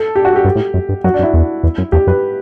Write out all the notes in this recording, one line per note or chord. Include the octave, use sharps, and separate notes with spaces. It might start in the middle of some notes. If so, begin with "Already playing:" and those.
Already playing: A4
G4
F#4
G4
G2
A2
F#2
G2
F#2 F#4
D4
F#2
E4
E2
E2
F#2
E2 G4
F#2 B4